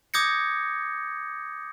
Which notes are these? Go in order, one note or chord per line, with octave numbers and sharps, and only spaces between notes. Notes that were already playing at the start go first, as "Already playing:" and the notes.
D6 D#6 G6 G#6 A#6 C#7